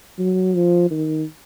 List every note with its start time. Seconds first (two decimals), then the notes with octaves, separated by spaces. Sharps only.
0.19 F#3
0.55 F3
0.91 D#3